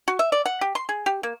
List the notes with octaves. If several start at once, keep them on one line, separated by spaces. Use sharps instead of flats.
F#4
E5
D5
F#5
G4
C6
G#4
G4
A#3